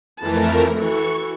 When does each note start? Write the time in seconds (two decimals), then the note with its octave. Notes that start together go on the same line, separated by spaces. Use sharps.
0.21 F2 E3 A3 A#4 A5
0.76 E3 F#4 A4 C#6